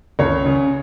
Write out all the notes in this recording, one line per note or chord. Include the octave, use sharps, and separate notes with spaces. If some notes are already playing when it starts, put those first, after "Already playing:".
C#2 C#5
C#3